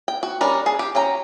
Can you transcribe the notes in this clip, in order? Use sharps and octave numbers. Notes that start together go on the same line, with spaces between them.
G5
F#4
G3 C#4 D4 A#4 D5
G#4 A5
G4
F#3 C#4 G5 A#5